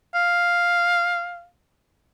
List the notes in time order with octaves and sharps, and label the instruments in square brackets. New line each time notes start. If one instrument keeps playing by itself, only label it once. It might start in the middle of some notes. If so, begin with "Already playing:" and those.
[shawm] F5